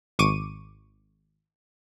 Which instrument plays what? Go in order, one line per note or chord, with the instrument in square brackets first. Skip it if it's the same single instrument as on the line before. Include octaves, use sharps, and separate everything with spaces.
[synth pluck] G#1 C#6 D6 D#7